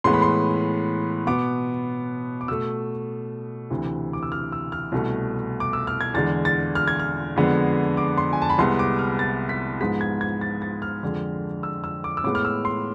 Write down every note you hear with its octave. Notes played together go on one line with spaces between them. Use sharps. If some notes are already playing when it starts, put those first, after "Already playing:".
A2 E3 G#3 B3 C6
B5
C6
B2 B3 D6
D6
B2 A3 E6
D2 C3 E3
D6
E6
F6
E6
F6
C2 B2 A3
D6
E6
F6
G#6
E2 D3 G#3 A6
A6
F6
G#6
F6
F2 D3 G#3 B3
D6
C6
G#5
A5
B5
C2 C3 G#3 B3 C6
D6
F6
A6
B6
G#2 F3 G#3 B3 B6
G#6
G#6
A6
A6
F6
F2 D3 G#3
E6
E6
D6
E6
A2 G#3 B3 D6
F6
E6
C6